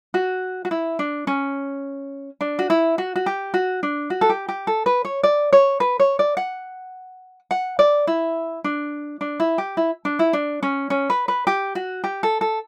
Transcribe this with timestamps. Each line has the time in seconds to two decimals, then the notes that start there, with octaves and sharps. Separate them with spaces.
0.14 F#4
0.65 F#4
0.71 E4
0.99 D4
1.27 C#4
2.41 D4
2.59 F#4
2.70 E4
2.98 F#4
3.16 F#4
3.26 G4
3.54 F#4
3.83 D4
4.10 F#4
4.21 A4
4.30 G4
4.48 G4
4.67 A4
4.86 B4
5.05 C#5
5.23 D5
5.53 C#5
5.80 B4
6.00 C#5
6.19 D5
6.37 F#5
7.51 F#5
7.79 D5
8.07 E4
8.64 D4
9.21 D4
9.40 E4
9.58 G4
9.77 E4
10.05 D4
10.19 E4
10.33 D4
10.63 C#4
10.90 C#4
11.10 B4
11.28 B4
11.47 G4
11.75 F#4
12.04 G4
12.23 A4
12.41 A4